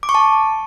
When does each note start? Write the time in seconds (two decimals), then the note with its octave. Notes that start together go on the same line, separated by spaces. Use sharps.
0.03 D6
0.09 C#6
0.15 A5